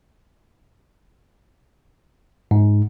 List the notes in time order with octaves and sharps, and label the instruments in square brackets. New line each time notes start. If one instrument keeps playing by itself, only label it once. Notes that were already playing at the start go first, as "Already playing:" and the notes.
[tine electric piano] G#2